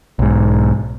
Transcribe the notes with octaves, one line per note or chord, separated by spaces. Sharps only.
B1 G#2